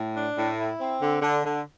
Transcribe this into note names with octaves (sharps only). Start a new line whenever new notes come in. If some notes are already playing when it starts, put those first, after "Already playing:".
Already playing: A2
D4
A2
E4
C4
D3
D3
D3